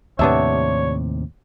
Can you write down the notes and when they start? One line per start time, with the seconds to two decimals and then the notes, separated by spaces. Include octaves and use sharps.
0.19 D#2 A2 C3 B3 D4 C#5 E5